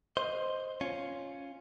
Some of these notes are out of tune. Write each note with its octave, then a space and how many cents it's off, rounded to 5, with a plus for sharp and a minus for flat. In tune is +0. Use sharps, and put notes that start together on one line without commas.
C5 +5 D#5 +0 C6 +5
C#4 +0 F4 +0